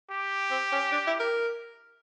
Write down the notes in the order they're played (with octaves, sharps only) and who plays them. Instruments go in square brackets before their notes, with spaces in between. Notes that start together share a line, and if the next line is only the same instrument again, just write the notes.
[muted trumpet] G4
[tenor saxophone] C4
C#4
D4
E4
A#4